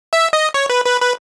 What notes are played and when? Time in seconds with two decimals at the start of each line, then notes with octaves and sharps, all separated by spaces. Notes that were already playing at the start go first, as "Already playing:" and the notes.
0.13 E5
0.33 D#5
0.54 C#5
0.70 B4
0.86 B4
1.01 B4